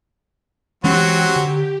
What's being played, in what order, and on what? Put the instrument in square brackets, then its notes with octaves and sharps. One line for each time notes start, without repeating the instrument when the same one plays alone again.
[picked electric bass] E3 G#3 C#4 [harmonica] F#3 C4 F#4 [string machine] G4
[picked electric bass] D3